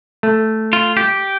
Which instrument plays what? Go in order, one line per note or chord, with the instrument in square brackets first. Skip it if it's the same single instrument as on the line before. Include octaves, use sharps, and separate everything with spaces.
[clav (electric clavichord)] A3
[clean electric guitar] F4
G4